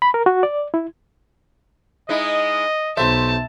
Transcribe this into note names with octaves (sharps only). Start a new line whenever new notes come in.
B5
A#4
F#4
D5
E4
G#3 D#4 E4 D#5
B1 C5 E5 A5